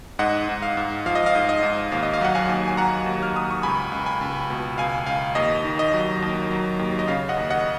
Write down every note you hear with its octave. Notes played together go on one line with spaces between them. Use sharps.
G#2 D#5 F#5
G#2
F5
G#2
F3 F5
D#5
F5
G#2
D#5
G#2
D#2 F5
D#5
F5
F#3 F#5
F5 G#5
D#2
G#5
F#3 F#5 A#5
D#2
F6
D#2 D#6
C#6
C#2 G#5 B5
C#2
G#5 B5
C#2
B2
C#2 F5 G#5
C#2 F5
D#2 D#5
D#3
D#5
F#3
D#2
F#3
D#2
D#5
C#3 F5
D#5 F#5
D#2
D#5 F#5